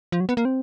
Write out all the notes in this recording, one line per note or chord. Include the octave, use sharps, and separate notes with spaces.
F3
F#3
B3
A#3
C4